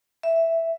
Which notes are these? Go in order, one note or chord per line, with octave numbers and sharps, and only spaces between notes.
E5